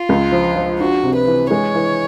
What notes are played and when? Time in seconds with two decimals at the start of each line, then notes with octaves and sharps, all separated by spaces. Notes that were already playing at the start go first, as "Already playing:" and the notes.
Already playing: F4
0.09 C#2
0.32 F3
0.56 F3
0.80 D4 F#4
1.03 C3
1.15 B4
1.27 E3
1.51 G#3 C#5
1.75 E3